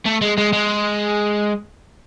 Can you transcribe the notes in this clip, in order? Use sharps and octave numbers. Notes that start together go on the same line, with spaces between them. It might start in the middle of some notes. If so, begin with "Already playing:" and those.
A3
G#3
G#3
G#3